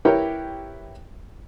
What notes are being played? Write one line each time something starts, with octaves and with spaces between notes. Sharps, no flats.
E4 G4 A#4 B4 C#5 G5